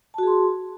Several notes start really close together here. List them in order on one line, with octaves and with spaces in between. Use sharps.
A5 F#4 G#4 C6